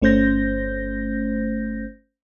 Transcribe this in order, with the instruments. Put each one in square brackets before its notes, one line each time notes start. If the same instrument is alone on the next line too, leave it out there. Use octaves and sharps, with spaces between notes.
[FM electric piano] G1 A3 C#4 C5 G6 A#6